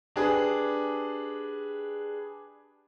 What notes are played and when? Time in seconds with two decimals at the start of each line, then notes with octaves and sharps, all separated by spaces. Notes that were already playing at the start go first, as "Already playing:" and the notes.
0.16 D4 G4 G#4 B4